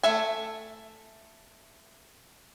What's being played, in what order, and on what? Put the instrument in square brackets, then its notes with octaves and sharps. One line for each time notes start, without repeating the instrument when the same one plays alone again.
[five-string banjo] A3 A4 E5 G#5